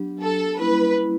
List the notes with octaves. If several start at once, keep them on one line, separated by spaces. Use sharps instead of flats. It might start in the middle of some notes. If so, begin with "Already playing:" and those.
Already playing: F#3 B3 D4 G4
A4
G3 A#3 C#4 E4 B4